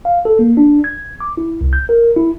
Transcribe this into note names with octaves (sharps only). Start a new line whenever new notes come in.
F5
A4
A#3
D4
G#6
D6
E4
C2
G6
A#4
E4